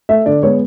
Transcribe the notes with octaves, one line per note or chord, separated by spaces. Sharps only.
A3 E5
D3 D5
G#3 B3 C#5